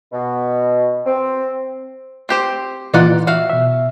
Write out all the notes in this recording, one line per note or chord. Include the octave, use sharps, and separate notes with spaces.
B2
C4
C4 G4 C5
A#2 E3 D#4 F4 D5 F#5
F#4 E5 F5
B2 E5